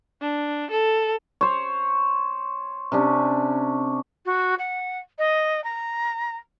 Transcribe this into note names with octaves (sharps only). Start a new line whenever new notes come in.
D4
A4
C5 C#5
C3 C#4 D4
F#4
F#5
D#5
A#5